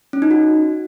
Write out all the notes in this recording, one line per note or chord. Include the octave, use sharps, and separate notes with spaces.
C#4
D#4
F#4